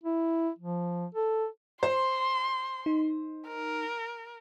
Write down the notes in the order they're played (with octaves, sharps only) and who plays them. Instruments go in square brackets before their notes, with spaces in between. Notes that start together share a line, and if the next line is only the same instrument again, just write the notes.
[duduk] E4
F3
A4
[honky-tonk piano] C5 [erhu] C6
[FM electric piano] D#4
[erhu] A#4